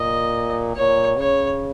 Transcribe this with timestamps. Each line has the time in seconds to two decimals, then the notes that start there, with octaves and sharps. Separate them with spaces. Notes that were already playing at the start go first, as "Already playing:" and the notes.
Already playing: A#2 D#5
0.76 A#2 C#5
1.18 C#3 C#5